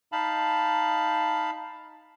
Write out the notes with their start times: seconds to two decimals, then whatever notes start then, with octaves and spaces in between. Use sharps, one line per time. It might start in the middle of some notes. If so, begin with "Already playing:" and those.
0.12 D#4 F5 A5 B5